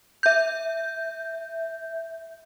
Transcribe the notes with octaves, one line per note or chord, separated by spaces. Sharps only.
E5 G6